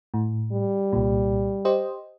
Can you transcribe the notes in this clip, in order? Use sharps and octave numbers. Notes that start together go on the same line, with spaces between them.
A2
G3
C2 A#2
G4 C5 D#5